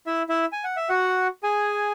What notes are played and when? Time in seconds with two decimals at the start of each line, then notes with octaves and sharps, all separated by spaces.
0.07 E4 E5
0.29 E4 E5
0.52 G#5
0.64 F#5
0.76 E5
0.89 F#4 F#5
1.43 G#4 G#5